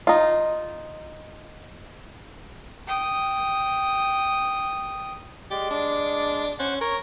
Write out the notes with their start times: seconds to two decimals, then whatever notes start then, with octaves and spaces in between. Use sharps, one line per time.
0.07 D#4 F4
2.87 G5 D#6
5.51 G#3 G4 D5
5.70 D4
6.59 C#4 C5 F#5
6.81 A#4 C#5